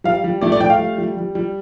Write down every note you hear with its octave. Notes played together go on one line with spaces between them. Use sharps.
G3 F5
G3
A3 D5
D5
A3 G5
F5
G3
G3
G3
G3